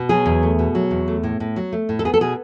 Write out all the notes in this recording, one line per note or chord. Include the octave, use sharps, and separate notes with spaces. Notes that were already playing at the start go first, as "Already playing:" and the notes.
Already playing: B2
F#3 G#4
E2
A3
B2
F#3
E2
A3
A2
A2
F#3
A3
A2
A4
B3 G#4
A4
B2 G#4